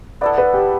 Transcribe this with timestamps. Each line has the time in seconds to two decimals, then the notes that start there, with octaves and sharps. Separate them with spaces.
0.21 B3 E4 A4 D5
0.38 B4
0.54 G4